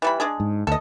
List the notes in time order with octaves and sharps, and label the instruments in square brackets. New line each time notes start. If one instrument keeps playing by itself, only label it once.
[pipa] E3 G3 B5
G#3 D4 G#4
[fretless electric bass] G#2
[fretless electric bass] D2 [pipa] A4 D#5